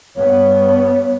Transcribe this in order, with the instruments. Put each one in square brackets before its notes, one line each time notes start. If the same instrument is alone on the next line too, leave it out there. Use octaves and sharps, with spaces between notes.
[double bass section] G2 B3 [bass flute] C#5